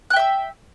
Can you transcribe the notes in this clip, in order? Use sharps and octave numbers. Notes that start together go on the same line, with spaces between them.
E5 G5 E6 F#6